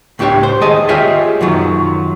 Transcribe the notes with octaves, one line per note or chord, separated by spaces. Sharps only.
C#2 A2 D4 G4 C#5
C5
D#2 G#3 G#4 D#5 A5
F4 G4 G#4 C#5 E5
F#2 D#3 F#3 F4